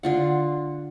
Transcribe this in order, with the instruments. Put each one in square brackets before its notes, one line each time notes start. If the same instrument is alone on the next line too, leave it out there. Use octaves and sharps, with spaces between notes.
[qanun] D3 F4 F#5